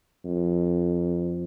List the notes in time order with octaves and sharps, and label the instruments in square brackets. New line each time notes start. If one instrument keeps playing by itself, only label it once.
[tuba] F2